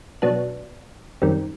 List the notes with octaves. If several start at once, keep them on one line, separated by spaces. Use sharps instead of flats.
B2 F#3 B3 D4
F#2 D#3 G3 C4